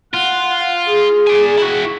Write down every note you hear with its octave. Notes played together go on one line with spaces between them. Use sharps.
F4 F#5
G#4
D5 G#5
E4 F#4